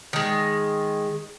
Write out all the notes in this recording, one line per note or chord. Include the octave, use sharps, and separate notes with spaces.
D#3 G#3